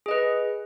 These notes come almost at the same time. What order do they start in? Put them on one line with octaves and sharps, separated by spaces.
G#4 D#5 B4